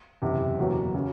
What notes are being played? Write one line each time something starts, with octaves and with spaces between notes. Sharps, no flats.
F#1 E2 C3
F#1 E2 B2 F#3 A#3
C#3 F#3